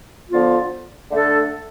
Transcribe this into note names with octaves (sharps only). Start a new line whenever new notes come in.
D3 F3 B3 F4
D3 A3 D4 A4